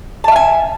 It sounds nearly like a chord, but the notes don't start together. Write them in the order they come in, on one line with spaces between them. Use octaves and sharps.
A5 E5 F5 G#5